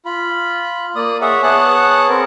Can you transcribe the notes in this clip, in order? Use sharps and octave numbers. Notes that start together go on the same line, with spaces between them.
F4 B5
A#3 D5 D#6
G#4 C#5 E5 F#5
B3 G#4 C#5 F#5 A5 F#6
C4 A#4